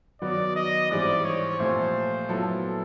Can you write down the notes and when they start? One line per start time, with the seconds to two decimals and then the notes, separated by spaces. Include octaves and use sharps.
0.21 D#3 F#3 B3 D#4 F#4 D5
0.56 D#5
0.91 G#2 E3 G3 C4 D5
1.25 C#5
1.59 A#2 F3 A3 C4 C5
2.29 A#2 F#3 B3 E4 A4